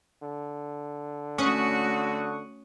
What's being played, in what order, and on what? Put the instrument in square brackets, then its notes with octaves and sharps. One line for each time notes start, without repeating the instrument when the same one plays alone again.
[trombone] D3
[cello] A3 F#4 [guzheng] C#4 [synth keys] C#6 D#6 F#6